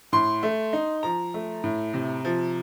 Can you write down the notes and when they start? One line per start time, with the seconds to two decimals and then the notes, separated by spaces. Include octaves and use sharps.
0.12 A2 C6
0.43 A3
0.73 D#4
1.03 F3 A#5
1.34 A3
1.64 A2
1.94 C3
2.25 F3